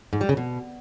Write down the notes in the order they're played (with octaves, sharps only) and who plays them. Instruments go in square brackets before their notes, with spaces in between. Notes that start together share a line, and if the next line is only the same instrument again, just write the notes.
[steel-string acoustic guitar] G#2
G3
C#3
B2